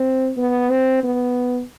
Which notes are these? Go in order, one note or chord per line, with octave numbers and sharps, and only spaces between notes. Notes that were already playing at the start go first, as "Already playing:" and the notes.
Already playing: C4
B3
C4
B3